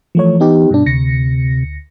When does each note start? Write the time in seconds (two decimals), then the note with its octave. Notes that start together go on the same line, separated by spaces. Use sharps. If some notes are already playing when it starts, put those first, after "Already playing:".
0.15 E3 F3 A3 C#5
0.40 B3 D#4 G4
0.70 G2 B2 D4
0.86 D2 C3 A#6 C#7